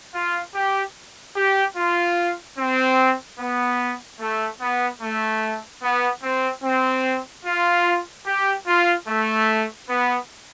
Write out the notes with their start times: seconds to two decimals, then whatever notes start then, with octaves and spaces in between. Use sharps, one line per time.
0.14 F4
0.55 G4
1.36 G4
1.77 F4
2.58 C4
3.39 B3
4.20 A3
4.61 B3
5.02 A3
5.83 B3
6.23 C4
6.64 C4
7.45 F4
8.27 G4
8.67 F4
9.08 A3
9.89 B3